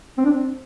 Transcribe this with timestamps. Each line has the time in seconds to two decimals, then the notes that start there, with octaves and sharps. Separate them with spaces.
0.18 C4
0.25 D4
0.32 C4